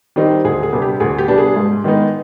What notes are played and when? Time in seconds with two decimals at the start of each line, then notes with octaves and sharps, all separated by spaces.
0.16 D#3 G3 C4 D#4
0.44 D2 G#4
0.63 G#4
0.73 C3 G3 B3 D4
0.82 G4
1.00 D2 G#4
1.18 G4
1.28 C3 G3 B3 D4
1.38 G#4
1.56 G#2
1.84 D#3 G#3 B3 D#4